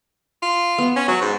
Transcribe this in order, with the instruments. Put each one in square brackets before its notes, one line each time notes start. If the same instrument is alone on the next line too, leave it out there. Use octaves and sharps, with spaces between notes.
[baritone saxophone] F4
[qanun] B3
[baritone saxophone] C#4
[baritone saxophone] F#3 [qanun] F#5
[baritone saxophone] G#2